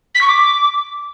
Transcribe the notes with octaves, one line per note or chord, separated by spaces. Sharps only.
B6
C#6
D6